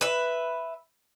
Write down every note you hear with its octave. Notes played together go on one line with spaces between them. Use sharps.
B4 E5